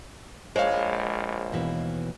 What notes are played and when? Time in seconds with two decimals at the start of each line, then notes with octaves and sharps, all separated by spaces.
0.56 A#1 G#3 C5 C#5 F5
1.52 D#2 B2 E3